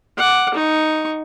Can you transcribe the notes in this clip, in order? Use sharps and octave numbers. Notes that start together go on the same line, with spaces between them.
F#5 D6
D#4 C#6